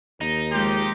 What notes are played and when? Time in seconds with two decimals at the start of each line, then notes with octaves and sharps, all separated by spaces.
0.21 D#2 D#4
0.52 F3 G#3 G4 C6